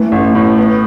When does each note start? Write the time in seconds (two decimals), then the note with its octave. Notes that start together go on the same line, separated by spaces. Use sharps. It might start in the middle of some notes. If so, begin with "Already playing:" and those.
Already playing: E3 A3
0.12 A1
0.35 A2
0.58 B3